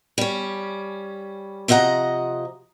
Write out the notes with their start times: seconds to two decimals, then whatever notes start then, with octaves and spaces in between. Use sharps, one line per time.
0.18 G3 C#4
1.68 C3 F3 D#5 F#5 A#5